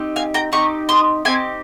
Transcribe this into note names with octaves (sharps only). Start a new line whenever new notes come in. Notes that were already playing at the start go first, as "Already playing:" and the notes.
Already playing: C4 D#4 G4
F5 G#5
G5 A#5
C4 D#4 G4 A#5 C#6
C6 D#6
C4 D#4 G4 G#5 C6